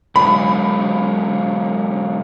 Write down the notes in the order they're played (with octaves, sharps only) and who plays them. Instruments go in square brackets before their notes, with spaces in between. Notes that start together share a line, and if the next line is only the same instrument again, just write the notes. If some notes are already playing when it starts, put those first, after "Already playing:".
[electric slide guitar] B2 F#3 G#3 [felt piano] B5